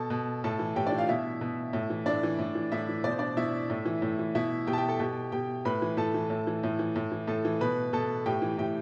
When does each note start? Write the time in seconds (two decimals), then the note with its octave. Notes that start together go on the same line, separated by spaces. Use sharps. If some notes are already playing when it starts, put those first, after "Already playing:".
Already playing: B2 A4 A5
0.10 B2
0.44 A2 A4 A5
0.59 E3
0.76 A2 G4 G5
0.87 D4 D5
0.92 E3
0.98 F4 F5
1.08 B2 E4 E5
1.41 B2
1.73 A2
1.90 E3
2.06 A2 D4 D5
2.23 E3
2.38 A2
2.55 E3
2.72 A2 E4 E5
2.89 E3
3.04 B2 D5
3.11 C5
3.18 D4 D5
3.37 B2 E4 E5
3.70 A2
3.86 E3
4.02 A2
4.19 E3
4.35 B2 E4 E5
4.67 B2 G4 G5
4.73 A5
4.78 G4 G5
4.89 A4 A5
4.99 B2 G4 G5
5.32 B2 G4 G5
5.65 A2 B4 B5
5.82 E3
5.97 A2 A4 A5
6.14 E3
6.30 A2
6.47 E3
6.63 A2
6.79 E3
6.96 A2
7.12 E3
7.27 A2 A4 A5
7.45 E3
7.61 B2 B4 B5
7.93 B2 A4 A5
8.26 A2 G4 G5
8.42 E3
8.58 A2 G4 G5